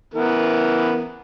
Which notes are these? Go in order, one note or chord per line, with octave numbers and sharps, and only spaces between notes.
E3 B3 A#4